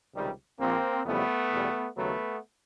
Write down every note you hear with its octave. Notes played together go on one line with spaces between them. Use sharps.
C#2 C3 D#3 G3
A#1 A#2 F3 A#3 C4
F2 C#3 E3 G3 A3 B3
E2 B2 G3
D#2 C#3 F#3 A3 B3